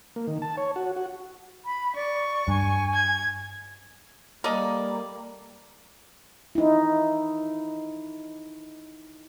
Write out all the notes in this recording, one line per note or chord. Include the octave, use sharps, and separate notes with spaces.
A#3
D#3
A5
C#5
F#4
F#4
B5
D5 C#6
G2 G#5
G#6
G3 A#3 A4 A#4 D5 D#5 A#5
D#4 E4